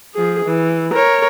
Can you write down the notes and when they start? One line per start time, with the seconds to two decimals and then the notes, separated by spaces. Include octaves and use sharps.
0.14 F3 G#4
0.46 E3
0.92 A#4 C#5